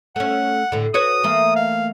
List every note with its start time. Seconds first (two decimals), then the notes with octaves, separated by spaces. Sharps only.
0.16 A3 C#4 F#5
0.72 A2 D3
0.94 F#4 B4 C#5 D#6
1.24 E3 A3 A#3
1.56 F5